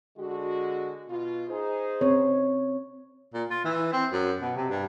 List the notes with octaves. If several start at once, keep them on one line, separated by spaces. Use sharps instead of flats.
D3 G#3 F#4
B2 F4
D#4 G#4 C5
C4 C#5
A#2
F4
E3
C4
F#2
B2
C3
G2